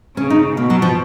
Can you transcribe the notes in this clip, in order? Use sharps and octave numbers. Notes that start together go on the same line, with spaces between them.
C#3 C#4
D#4
B2 A#3
F#3
F3